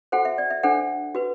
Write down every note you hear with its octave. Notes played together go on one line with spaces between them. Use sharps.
F#4 A4 C5 F#5
E5
D5
E5
D4 A4 C5 F#5
F#4 B4